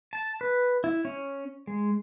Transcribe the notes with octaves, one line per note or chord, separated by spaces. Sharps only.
A5
B4
E4
C#4
G#3